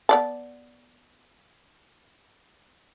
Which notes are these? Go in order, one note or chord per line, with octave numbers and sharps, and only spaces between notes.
B3 D5 A5